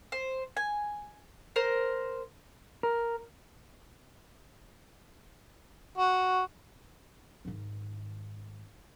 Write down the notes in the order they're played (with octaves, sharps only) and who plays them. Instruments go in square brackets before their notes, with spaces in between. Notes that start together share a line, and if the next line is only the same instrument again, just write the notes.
[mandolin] C5
G#5
A#4 C5
[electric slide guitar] A#4
[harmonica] F#4
[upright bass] G#2 D#3